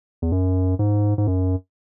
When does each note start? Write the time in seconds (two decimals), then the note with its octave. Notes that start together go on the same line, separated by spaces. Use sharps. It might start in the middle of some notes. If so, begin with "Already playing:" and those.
0.22 E2
0.32 F#2
0.79 G#2
1.18 G#2
1.27 F#2